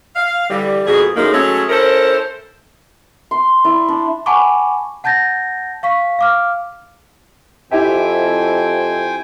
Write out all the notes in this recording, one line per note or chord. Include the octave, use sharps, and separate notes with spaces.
F5
D3 E3 G3
F2 G#2 B2 G#4
F#2 A2 G#3 A#3 D#4
F#3 G#3 A3 C#4
C#4 E4 A4 A#4 C5
C6
E4 D5
D4
F#5 G#5 A5 B5 C#6 D6
F#5 A5 G6 A6 A#6
F5 C#6 B6
F5 D6 F6
F2 E4 G4 C5 E5 G5 G#5